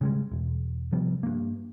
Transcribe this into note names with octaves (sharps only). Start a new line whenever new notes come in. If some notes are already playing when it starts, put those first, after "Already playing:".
C#3 G3 G#3
E1
C3 F3 G3 B3
G2 A#3